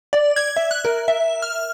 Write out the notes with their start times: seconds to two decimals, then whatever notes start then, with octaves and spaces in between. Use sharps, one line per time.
0.13 D5
0.36 G#6
0.57 E5
0.71 F#6
0.85 A#4
1.08 E5
1.42 F6